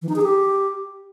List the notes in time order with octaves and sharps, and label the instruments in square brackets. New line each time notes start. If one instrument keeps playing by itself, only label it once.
[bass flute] E3
D#4
G#4
G4